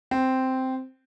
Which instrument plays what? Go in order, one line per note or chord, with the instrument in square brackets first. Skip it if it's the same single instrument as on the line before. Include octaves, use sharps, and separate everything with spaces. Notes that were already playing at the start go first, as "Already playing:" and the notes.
[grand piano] C4